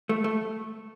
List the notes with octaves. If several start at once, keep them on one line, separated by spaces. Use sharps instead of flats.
A3
A3